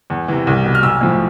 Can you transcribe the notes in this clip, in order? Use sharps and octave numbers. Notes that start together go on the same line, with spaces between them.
E2
C3 E3
C2
B2
F6
B1 E6
A2 F3